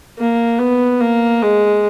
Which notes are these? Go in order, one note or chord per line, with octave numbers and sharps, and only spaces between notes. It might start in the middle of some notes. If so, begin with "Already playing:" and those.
A#3
B3
A#3
G#3